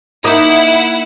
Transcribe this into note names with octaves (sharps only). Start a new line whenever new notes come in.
A#3 D#4 E4 F#5